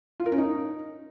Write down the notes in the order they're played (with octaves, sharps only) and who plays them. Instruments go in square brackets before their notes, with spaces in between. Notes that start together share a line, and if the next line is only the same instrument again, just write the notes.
[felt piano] F4
A#4
C#4
D#4